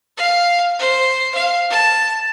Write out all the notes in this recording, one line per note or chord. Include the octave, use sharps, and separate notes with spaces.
F5
C5
F5
A5